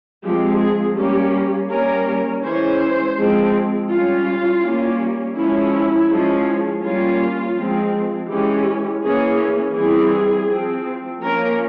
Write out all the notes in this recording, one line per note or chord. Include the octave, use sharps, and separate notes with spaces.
F3 G#3 C4 G4
G#4
G3 A#3 C#4 G4
G3 A#3 C#4 A#4
E3 G#3 C#4 C5
F3 G#3 C4
G3 C#4 F4
G3 A#3 C#4
F3 G#3 C#4 E4
F3 G#3 C#4
G3 A#3 C#4 F4
F3 G#3 C4
E3 G#3 C#4 G4
E3 A#3 C#4 G#4
E3 G3 C4 G#4
F3 C4
F3 A#3 C#4 A#4